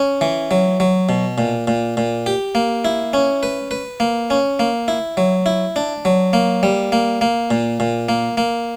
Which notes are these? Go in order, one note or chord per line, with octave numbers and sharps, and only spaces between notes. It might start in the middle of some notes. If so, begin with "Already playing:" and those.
Already playing: C#4
E3
F#3
F#3
B2
A#2
A#2
A#2
G4
A#3
E4
C#4
B4
B4
A#3
C#4
A#3
E4
F#3
E4
D4
F#3
A#3
G3
A#3
A#3
A#2
A#2
A#3
A#3